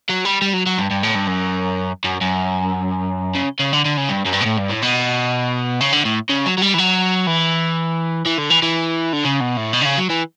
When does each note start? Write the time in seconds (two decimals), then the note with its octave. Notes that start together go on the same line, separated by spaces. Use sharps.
0.09 F#3
0.25 G3
0.42 G3
0.53 F#3
0.66 F#3
0.78 G2
0.91 G2
1.03 A2
1.15 G2
1.27 F#2
2.05 F#2
2.21 F#2
3.35 C#3
3.60 C#3
3.73 D3
3.85 D3
3.97 C#3
4.09 G2
4.26 F#2
4.34 G2
4.42 B2
4.46 A2
4.58 G2
4.70 A2
4.82 B2
5.81 C#3
5.93 D3
6.05 A2
6.30 C#3
6.46 F#3
6.58 F#3
6.62 G3
6.74 E3
6.79 F#3
7.27 E3
8.26 E3
8.38 D3
8.50 E3
8.62 E3
9.13 D3
9.24 C#3
9.40 B2
9.57 A2
9.73 B2
9.81 D3
9.85 C#3
9.97 F#3
10.10 E3